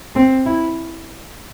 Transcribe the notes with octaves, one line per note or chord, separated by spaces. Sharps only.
C4
E4